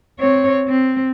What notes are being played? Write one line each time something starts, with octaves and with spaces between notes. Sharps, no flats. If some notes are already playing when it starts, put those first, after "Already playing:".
C4 C#5
C4